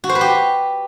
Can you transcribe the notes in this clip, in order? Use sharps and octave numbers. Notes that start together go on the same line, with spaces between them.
F#4
C5
B4
G4